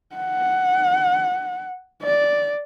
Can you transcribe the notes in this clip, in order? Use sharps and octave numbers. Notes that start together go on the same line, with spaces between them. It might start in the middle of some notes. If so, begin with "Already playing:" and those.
F#5
D5